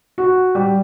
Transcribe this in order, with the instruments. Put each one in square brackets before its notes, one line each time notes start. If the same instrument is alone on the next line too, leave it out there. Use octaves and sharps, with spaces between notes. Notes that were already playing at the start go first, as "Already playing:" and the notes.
[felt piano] F#4
G3